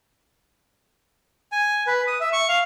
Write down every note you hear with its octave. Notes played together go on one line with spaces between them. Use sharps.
G#5
B4
D#6
E5
C#6
F5